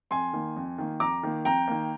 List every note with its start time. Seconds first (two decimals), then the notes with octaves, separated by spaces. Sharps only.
0.11 F2 G#5 C6
0.33 D#3 A#3
0.56 F2
0.78 D#3 A#3
1.00 F2 A#5 D6
1.23 D#3 A#3
1.45 F2 G5 A#5
1.68 D#3 A#3